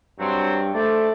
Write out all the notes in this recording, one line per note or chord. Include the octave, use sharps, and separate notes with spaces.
G2 F#3 C4
A3 D4 C5 D5